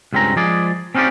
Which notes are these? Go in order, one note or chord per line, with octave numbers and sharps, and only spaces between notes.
C#2 G2 C4 C#4 A#5
F3 G#3 G#4 D5
C4 C#4 D#4 F4 G4 D5